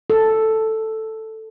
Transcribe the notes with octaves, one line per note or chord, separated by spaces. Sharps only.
A4